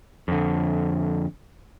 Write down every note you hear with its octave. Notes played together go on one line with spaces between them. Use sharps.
F2 D3